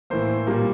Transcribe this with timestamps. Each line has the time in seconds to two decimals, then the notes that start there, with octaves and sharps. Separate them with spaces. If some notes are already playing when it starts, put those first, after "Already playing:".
0.10 A2 E3 A#3 C5
0.47 A#2 G3 A#3